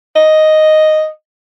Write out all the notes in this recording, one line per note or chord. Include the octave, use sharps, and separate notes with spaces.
D#5